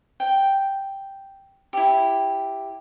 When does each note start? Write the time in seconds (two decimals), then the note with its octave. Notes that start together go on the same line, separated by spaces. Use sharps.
0.20 G5
1.73 E4 G4